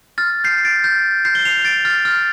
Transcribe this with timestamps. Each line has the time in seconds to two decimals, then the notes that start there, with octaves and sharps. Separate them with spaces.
0.18 F6 A6
0.44 G6 C7
0.65 A6 D7
0.84 G6
1.25 G6 C7
1.35 G7
1.45 C7 F7
1.65 A6 D7
1.85 F6 A6
2.05 F6